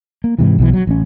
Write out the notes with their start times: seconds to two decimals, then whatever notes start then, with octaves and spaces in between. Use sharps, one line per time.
0.24 A#3
0.38 G#2 C3 E3
0.58 B1 B2 E3
0.73 F#3
0.87 A1 C#4